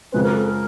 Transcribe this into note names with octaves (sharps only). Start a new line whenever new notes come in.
F#2 C#3 F3 G#3 C4 B4
A#4
A4
A#4